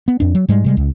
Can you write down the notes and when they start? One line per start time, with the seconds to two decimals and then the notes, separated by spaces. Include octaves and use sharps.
0.08 B3
0.20 F2 D4
0.35 F#3
0.48 G#2 G3 G#3
0.64 C3 G3 G#3
0.77 C#2